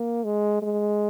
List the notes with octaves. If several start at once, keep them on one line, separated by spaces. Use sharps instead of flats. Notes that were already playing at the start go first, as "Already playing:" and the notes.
Already playing: A#3
G#3
G#3